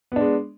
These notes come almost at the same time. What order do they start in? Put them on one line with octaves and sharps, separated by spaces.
B3 D4 G#3